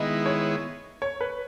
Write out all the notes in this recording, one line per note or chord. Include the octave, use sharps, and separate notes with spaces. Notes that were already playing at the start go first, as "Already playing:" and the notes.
Already playing: D#3 G#3 B3 E4 D#5
C#5
C#5
B4